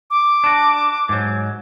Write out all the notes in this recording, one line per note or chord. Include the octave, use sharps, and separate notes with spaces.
D6
D4 F#4
G#2 F#3